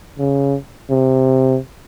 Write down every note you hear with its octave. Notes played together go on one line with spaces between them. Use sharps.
C#3
C3